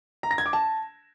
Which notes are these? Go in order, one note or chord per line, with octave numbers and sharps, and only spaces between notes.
A#5
A#6
G#6
D6
A5